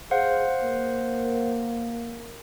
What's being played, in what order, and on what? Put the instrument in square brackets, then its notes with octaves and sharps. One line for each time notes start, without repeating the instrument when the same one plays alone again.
[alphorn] G#4 [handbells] C5 F5 F#5
[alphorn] A#3